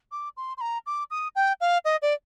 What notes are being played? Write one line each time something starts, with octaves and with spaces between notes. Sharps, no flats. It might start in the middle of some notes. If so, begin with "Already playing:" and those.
D6
C6
C6
A#5
D6
D#6
G5
F5
D#5
D5